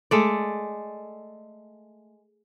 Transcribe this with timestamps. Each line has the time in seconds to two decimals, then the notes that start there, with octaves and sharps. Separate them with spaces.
0.11 G#3 A3 D5